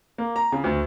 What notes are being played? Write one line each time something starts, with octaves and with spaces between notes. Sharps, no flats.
A#3
A#5
C#3
D2